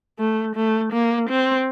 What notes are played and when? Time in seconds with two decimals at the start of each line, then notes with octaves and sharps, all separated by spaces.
0.19 A3
0.55 A3
0.93 A#3
1.29 C4